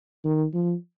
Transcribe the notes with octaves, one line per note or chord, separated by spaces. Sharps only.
D#3
F3